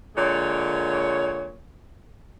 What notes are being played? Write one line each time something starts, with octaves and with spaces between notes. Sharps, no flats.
A#2 D3 G#3 C#5